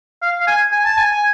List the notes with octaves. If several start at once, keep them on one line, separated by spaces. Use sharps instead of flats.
F5
F5
G#5
G#5
A5
G#5
G#5